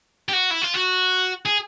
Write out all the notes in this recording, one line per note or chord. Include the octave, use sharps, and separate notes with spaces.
G4
F#4
E4
F4
F#4
G#4